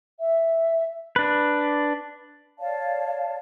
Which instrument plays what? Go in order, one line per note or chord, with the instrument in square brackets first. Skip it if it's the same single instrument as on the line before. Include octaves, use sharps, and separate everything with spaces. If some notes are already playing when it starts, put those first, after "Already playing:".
[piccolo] E5
[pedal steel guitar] D4 B4
[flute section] C#5 D5 F5 A5